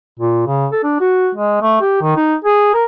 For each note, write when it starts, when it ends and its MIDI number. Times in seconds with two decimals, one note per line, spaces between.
0.20 0.46 46
0.47 0.67 49
0.72 0.82 69
0.84 0.96 62
1.00 1.30 66
1.35 1.60 56
1.62 1.78 57
1.81 1.98 67
2.01 2.15 51
2.16 2.35 63
2.45 2.74 68
2.74 2.85 70